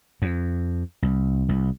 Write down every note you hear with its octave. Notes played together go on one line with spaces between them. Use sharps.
F2
C2
C2